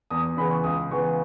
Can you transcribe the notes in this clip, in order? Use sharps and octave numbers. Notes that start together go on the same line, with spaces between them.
E2 D#6
D#6
C#3 E3 B3 B5
C#6
C#2 D#6
C#3 E3 B3 C#6